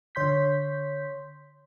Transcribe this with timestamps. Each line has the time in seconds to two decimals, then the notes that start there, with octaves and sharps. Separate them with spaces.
0.15 D3 C#5 C6 G6 B6